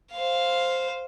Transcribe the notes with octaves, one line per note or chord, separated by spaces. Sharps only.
C5 F5